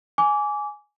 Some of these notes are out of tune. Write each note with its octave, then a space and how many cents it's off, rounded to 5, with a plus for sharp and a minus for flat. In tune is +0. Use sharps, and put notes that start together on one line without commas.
G#5 +5 D6 -25